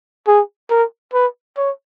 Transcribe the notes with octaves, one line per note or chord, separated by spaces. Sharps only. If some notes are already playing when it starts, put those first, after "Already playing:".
G#4
A#4
B4
C#5